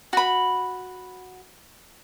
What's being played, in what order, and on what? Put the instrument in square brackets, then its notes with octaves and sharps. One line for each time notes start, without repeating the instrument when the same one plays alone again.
[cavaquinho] F#4 B5